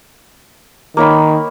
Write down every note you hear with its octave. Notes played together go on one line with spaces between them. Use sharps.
D#3 A#3 C#5 B5